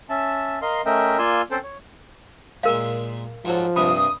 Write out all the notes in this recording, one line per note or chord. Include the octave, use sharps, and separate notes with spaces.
C#4 E5 A5
A#4 D#5 F5 C6
A3 C#4 A#4 D#5 E5 G5
A#3 F4 D5 G#5 C6 E6
C4 C#4 A4 C5 G5 A5
C#5
A#2 G#3 A#4 F5
G#2 F3 F#3 A4
C2 G2 C3 B5 D#6